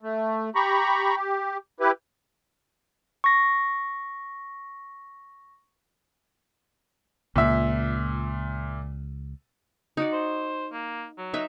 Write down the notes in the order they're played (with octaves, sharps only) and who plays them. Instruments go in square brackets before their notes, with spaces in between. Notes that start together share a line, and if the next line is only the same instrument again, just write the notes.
[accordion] A3
G4 A#5 B5 C#6
G4
E4 G4 B4
[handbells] C#6 A#6
[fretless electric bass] C#2 [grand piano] A#2 E5
[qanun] D#4 F#4 D5
[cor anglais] C5
A#3
F#3
[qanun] D#4 B4 E5